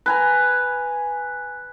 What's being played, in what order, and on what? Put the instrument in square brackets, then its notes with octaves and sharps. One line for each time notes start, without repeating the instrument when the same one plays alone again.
[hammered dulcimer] B4 G#5 A#5